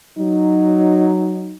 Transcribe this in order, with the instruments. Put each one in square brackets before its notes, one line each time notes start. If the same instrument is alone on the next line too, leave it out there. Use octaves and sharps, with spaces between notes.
[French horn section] F#3 D#4